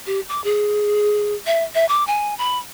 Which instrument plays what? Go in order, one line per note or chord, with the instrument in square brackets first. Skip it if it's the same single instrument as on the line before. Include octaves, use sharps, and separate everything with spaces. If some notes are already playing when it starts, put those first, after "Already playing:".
[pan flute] G4
D6
G#4
E5
E5
D6
G#5
B5